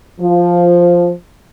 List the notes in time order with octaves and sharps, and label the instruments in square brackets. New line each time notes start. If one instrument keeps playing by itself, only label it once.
[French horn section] F3